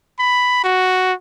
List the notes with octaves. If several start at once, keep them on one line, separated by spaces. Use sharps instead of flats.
B5
F#4